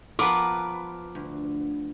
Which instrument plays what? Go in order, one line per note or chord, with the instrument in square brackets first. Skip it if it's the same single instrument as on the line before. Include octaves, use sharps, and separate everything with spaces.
[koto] F3 B3 B4 [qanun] A#4 [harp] D6
[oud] D2